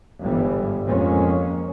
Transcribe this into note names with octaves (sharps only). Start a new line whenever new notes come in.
G1 G#2 E3 G3
F2 G#3 A#3 C#4